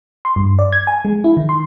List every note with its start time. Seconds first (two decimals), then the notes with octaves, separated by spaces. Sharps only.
0.25 C6
0.36 G2
0.59 D5
0.72 G#6
0.87 G#5
1.05 G#3
1.24 E4
1.37 D#3
1.49 C6